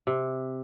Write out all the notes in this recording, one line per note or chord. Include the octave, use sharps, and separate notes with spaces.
C3